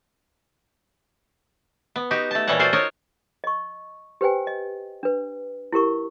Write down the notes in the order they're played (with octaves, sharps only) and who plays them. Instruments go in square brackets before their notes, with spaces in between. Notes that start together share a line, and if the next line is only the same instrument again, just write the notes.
[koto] B3
D#4 F#4 G4
A3 A5
A#2 E3 G3 A4 C#5 F#5
F4 F#4 A4 C5 D5 F5
D#4 A#4 C#5 D#5
[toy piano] D#5 C#6
G4 B4 C5 G5 G#5
D#5
D4 B4
E4 G4 A#4 C#6